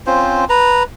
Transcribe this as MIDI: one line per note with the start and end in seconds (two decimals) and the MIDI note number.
0.07 0.45 60
0.07 0.45 61
0.07 0.45 65
0.07 0.45 72
0.49 0.83 71
0.49 0.83 82